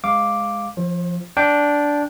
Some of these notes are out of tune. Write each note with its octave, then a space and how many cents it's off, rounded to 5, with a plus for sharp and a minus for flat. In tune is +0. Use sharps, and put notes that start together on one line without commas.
G#3 +0 F5 +0 D6 +0
F3 -10 C5 +40
D4 -10 G5 +0